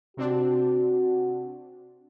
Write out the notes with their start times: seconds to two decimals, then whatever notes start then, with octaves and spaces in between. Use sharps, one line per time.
0.17 C3 C4 D4 F#4